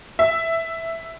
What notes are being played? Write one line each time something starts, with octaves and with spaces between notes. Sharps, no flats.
E5